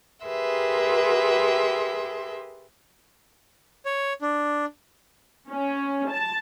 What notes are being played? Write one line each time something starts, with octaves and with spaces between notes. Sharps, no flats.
G4 G#4 A#4 B4 E5 C6
C#5
D4
C#4
A5